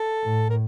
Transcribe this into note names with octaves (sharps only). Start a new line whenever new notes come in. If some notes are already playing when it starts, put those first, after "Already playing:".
Already playing: A4
A2
A#4